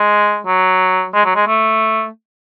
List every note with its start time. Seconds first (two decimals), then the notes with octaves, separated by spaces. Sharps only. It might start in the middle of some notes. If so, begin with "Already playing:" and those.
Already playing: G#3
0.47 F#3
1.14 G#3
1.25 F#3
1.36 G#3
1.47 A3